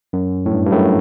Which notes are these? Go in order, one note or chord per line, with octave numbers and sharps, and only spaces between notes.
F#2
A2
G2
G2
F#2 A2